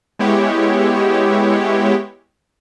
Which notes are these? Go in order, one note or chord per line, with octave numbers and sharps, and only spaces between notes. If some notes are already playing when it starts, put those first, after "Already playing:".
G#3 B3 E4 G4 C#5